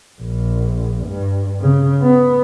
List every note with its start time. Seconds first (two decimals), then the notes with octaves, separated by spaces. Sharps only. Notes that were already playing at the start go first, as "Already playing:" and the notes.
0.21 A#1
1.06 G2
1.60 C#3
2.02 B3